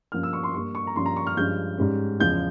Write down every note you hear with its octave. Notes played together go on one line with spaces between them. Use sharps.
G2 F3 A#3 C#4 F6
E6
C#6
C6
G2 G3 A#3 C#6
C#6
A#5
G2 F3 A#3 C#4 C6
A#5
C#6
F6
G2 F3 G#3 C#4 G6
G#2 G3 C#4
E2 C#3 F3 G#3 G6